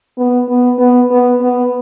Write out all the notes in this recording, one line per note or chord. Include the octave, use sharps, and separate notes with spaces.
B3
B3
B3
B3
B3